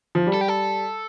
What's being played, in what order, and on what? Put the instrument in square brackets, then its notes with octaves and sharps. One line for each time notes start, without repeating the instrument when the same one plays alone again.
[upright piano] F3
G3
[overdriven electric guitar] A4
G4
A4